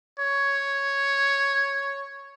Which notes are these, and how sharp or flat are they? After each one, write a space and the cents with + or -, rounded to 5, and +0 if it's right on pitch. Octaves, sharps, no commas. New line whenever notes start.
C#5 +0